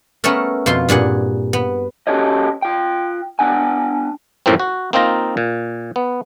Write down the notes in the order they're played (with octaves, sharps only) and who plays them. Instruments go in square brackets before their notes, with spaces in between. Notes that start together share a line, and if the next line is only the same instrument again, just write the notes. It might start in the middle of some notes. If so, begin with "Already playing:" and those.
[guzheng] A3 B3 C#4 A4 A#4
F2 B2 F4 C6
G2 A#2 G#4 F#5
B3
[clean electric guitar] C#4 F#4 G4 A4 C#5 D#5
F4 G5
B3 D4 F#5 G#5
[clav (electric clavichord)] F#2 A2 F3 A#3 C4
F#4
A#3 C4 D#4 F4 A#5
A#2
B3